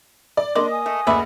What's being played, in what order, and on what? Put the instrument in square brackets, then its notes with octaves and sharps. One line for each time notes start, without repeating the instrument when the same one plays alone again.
[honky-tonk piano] D5
[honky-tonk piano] A#3 D#5 [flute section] D4 C6 [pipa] D5
[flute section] G#5 D#6
[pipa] A3
[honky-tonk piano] F#1 D2 [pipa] B4 D5 E5